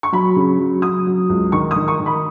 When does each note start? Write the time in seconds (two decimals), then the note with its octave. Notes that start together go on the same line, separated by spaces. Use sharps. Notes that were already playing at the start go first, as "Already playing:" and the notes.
0.03 C#6
0.13 F#3 B5
0.36 C#3
0.59 F#3
0.82 F#3 D#6
1.07 F#3
1.29 C#2
1.52 D#3 C#6
1.71 D#6
1.76 D#3
1.88 C#6
2.00 D#3
2.06 B5